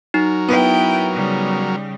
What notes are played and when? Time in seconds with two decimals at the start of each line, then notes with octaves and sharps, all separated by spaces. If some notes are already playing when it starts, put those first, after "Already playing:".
0.14 F#3 D#4 A#4
0.48 B3 E4 G5
1.12 C#3 G3